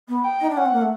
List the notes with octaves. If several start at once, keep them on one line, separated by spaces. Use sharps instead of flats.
B3
G5
D#4
D4
C#4 F#5
C4
A#3
A3